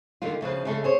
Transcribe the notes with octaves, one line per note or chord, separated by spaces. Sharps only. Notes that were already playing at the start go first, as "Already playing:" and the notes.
D3 D#3 G3 A#3 F4
D2 C#3 F3 B4
C#3 G#3 A3 D#4 A4
G#4 C5 C#5